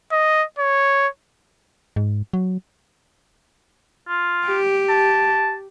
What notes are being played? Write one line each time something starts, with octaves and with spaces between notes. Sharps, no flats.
D#5
C#5
G#2
F#3
F4
G4
A5